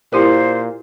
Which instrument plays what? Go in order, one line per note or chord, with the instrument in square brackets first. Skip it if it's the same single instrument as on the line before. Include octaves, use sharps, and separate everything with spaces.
[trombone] A#2 [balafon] E4 G4 A#4 [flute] C5